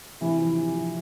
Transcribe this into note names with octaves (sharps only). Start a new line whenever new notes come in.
C3 E3 E4
F3
C3
F3